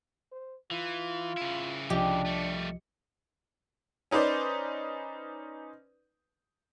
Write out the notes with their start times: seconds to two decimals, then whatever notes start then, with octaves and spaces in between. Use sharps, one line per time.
0.32 C5
0.71 E3 F4
1.37 C#3 E4
1.90 C2 F3 D4 G4 D#5
2.26 G3 A3
4.11 C#4 D#4 B4 C5 D5